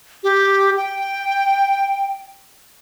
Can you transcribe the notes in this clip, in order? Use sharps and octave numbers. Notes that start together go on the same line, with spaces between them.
G4
G5